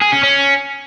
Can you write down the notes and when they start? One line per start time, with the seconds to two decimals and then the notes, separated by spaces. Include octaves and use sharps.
0.01 G#4
0.12 C#4
0.23 C#4